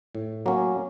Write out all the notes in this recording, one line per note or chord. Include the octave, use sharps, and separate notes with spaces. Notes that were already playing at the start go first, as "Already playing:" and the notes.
A2
F#3 A#3 C#4